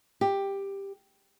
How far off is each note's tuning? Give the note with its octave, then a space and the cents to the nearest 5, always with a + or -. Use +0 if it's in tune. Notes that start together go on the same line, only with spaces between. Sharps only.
G4 +10